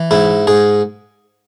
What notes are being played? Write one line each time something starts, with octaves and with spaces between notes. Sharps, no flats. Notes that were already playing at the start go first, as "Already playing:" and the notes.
Already playing: E3
G#2 E4
G#2 G#4